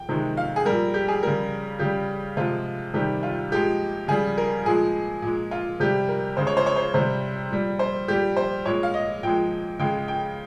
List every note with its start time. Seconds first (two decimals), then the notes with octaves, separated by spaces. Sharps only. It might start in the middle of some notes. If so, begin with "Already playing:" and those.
Already playing: G5
0.09 C3 D#3 G#3
0.37 F5
0.56 G#4
0.65 A#2 G3 A#4
0.94 G4
1.08 G#4
1.23 C#3 G3 A#4
1.79 C#3 G3 G4
2.37 C3 F3 G#3 F4
2.94 C3 D#3 G3 G4
3.23 F4
3.52 A#2 F3 G#3 G4
4.08 C#3 G3 G#4
4.38 A#4
4.65 A#2 F3 G#3 G#4
5.22 A#2 G#3
5.51 F4
5.80 C3 G3 G4
6.08 A#4
6.37 C#3 G#3 C5
6.47 C#5
6.57 C5
6.66 C#5
6.76 C5
6.94 C3 G3 C5
7.51 A#2 G3
7.79 C5
8.08 A#2 G3 G4
8.37 C5
8.66 A#2 G#3 C#5
8.83 F5
8.94 D#5
9.23 A#2 F3 G#3 G5
9.79 C#3 G#3 G5
10.08 G5